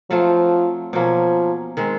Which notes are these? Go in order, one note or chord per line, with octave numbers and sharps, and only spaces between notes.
F3 F#3 A3 C4 F4
B2 F3 F#3 A#3 C#4
D#3 G#3 C4